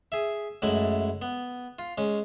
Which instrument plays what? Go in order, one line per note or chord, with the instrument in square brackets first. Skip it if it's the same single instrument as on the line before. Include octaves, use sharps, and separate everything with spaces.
[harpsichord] G#4 E5
F#2 G#3 A3 E4 B5
B3
F4
G#3 C#4